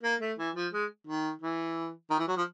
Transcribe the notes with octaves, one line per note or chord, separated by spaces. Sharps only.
A#3
A3
E3
F3
G#3
D#3
E3
D#3
E3
F#3
F3